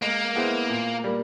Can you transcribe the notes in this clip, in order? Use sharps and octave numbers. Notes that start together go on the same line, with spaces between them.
G#3 A#3
B3 E4 G#4 C5
A#2
G3 A#3